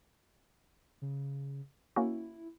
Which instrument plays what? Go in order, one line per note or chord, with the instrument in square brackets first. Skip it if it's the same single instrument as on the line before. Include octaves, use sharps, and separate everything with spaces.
[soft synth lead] C#3
[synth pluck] A#3 C#4 F#4 [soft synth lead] E4